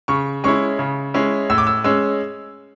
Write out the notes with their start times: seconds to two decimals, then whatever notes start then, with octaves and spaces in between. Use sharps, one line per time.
0.08 C#3 C#6
0.44 G#3 C#4 E4 C#6
0.79 C#3
1.14 G#3 C#4 E4
1.50 A2 E6
1.58 D6
1.67 E6
1.84 G#3 C#4 E6